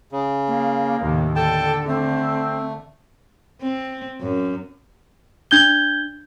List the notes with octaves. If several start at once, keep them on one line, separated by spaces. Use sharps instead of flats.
C#3
A#3
D#2 A2 C3
D3 A4 G5 A5
A3 C4
C4
F#2
D4 G6 G#6 G7